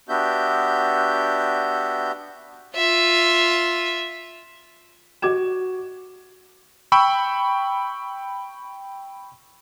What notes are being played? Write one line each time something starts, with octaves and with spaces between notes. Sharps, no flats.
B3 D4 F#4 G4 E5 G6
F4 E5
F#4 D6 G#6 E7
G5 B5 C#6 E6